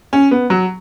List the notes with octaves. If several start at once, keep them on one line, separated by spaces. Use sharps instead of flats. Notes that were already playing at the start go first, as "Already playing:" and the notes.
C#4
B3
F#3